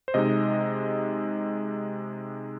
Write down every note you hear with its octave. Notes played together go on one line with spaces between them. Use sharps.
C5
C3 G#3 D#4 D#5